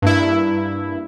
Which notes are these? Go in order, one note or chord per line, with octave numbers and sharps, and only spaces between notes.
G2 A#3 E4